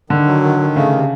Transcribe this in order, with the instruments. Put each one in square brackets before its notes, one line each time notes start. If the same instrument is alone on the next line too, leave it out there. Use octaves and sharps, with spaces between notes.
[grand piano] D3 [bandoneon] D#3
[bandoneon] F#3
D#3
D#3
[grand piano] C#3 [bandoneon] A3
[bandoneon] C3